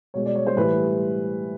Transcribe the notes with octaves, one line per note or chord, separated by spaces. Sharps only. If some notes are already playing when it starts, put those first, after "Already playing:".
B2 G#3 C#5
D5
C#5
C5
A2 E3 G3 B4